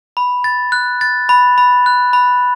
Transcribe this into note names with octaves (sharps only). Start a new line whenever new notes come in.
B5
A6
F#6
A6
B5
B5
F#6
B5